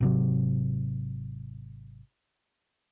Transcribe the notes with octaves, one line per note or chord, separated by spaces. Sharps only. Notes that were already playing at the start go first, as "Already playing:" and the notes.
G#1 C3 F#3